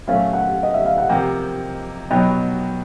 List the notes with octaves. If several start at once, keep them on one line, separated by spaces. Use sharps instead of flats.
A#2 F#3 A3 C#4 F5
F#5
D#5
E5
F5
F#5
C3 F3 A#3 G5
B2 F#3 B3 D#4 G5